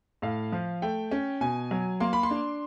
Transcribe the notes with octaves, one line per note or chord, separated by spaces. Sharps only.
A2 F5
F3
A3 G5
C#4
B2 G#5
F#3
A#3 C6
B5
C6
D4